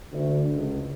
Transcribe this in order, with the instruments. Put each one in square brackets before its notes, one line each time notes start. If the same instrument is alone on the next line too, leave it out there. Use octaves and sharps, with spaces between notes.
[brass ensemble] D2
C#2